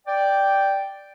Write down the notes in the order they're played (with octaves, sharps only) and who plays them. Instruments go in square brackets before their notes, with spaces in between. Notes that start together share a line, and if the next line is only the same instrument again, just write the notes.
[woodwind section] D5 G5